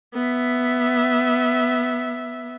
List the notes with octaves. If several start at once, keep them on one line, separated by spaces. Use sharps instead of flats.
B3 E5